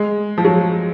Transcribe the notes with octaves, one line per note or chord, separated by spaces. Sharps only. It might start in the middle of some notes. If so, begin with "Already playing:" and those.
Already playing: G#3
F3
F#3